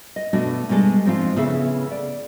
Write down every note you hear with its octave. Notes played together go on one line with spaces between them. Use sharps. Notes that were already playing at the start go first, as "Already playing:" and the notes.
D#5
B2 A3 D4 F#4
B2 G3 G#3 A4
G#2 F3 C4 D4 F4
A2 C#3 B3 G#4 A4 E5
D5